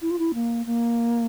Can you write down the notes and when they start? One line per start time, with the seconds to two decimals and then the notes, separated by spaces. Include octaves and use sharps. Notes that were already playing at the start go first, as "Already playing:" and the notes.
0.01 E4
0.10 F4
0.19 E4
0.34 A#3
0.66 A#3